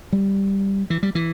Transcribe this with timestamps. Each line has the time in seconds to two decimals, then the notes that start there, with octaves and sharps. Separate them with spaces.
0.12 G3
0.90 E3
1.03 G3
1.15 E3